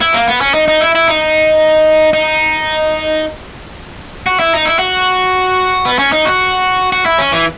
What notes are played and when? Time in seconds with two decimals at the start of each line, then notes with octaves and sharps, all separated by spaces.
0.02 E4
0.14 A#3
0.28 B3
0.41 C#4
0.54 D#4
0.68 D#4
0.81 E4
0.95 E4
1.08 D#4
2.13 D#4
4.26 F#4
4.40 E4
4.53 D#4
4.66 E4
4.79 F#4
5.85 B3
5.99 C#4
6.12 D#4
6.25 F#4
6.92 F#4
7.06 E4
7.18 C#4
7.32 E3